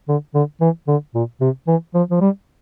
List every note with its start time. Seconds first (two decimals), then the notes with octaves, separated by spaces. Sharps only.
0.08 D3
0.34 D3
0.61 E3
0.88 D3
1.15 A#2
1.41 C3
1.67 E3
1.94 F3
2.10 F3
2.21 G3